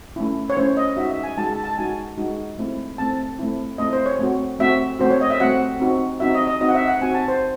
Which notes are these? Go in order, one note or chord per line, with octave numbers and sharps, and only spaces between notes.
A3 C#4 E4
C#5
A3 C#4 E4 C5
D#5
G#3 D#4 F#4 E5
E5
G#5
G#3 D#4 F#4 A5
A5
A5
G#3 D#4 F#4 G#5
G#3 D#4 F#4
A3 C4 E4
A3 C4 E4 A5
A3 C4 E4
A3 C4 E4 D#5
C5
C#5
A3 C4 F#4
A3 C4 F#4 E5
A3 C4 F#4 C5
C#5
D#5
E5
A3 C4 F#4 F#5
C4 D#4 F#4
C4 D#4 F#4 E5
D#5
D#5
C4 D#4 F#4 D#5
F#5
E5
F#5
C4 D#4 F#4 G#5
A5
C5